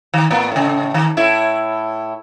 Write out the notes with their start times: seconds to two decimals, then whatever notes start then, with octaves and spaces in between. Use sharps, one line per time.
0.14 D#3
0.30 A2 A#3 B3
0.52 A2 C#3
0.94 D#3
1.17 A2 E4